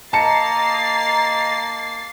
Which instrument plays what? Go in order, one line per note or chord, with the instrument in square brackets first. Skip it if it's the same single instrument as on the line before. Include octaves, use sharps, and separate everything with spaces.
[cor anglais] A#3 [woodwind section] D#5 A#5 [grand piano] A5 C#7 [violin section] A6 C7